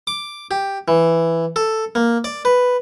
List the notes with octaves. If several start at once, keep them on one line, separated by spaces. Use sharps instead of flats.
D6
G4
E3
A4
A#3
D5
B4